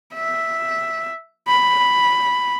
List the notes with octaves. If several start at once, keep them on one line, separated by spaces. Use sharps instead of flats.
E5
B5